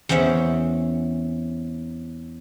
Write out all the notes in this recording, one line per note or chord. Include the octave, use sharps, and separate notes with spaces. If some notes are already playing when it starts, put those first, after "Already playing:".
E2 C4 C#4 E5 F#5